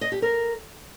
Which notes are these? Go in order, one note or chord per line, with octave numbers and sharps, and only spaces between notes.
D#5
G4
A#4